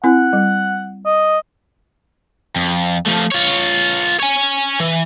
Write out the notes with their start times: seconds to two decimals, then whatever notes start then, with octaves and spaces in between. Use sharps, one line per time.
0.04 C4 E4 F#5
0.33 G3
1.05 D#5
2.56 F2
3.07 F3 A3
3.32 F4 C#5
4.20 C#5 G#5
4.80 E3